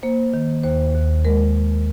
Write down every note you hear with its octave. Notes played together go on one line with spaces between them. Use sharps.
A#3 C5
D#3
D#2 C5
D#2
G#3 A#4